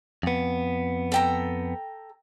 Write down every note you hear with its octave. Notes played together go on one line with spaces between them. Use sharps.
F2 B3
A4 G5 A#5